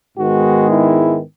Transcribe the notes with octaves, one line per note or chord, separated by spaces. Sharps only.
G#2 D#3 G#3 B3 F#4
E4